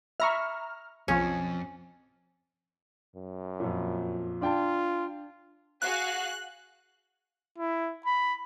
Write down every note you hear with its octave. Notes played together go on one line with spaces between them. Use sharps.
E5 A#5 B5 C#6 F6
B1 F2 F3 C#4
F#2
F2 A#2
D4 F4 G5 A5
F#4 G#4 F5 F#6
E4
B5